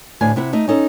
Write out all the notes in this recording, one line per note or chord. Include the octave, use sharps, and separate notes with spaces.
D2 A2 G#5
C3 E4 F#5
A3 D#4
C#4 D#4 A4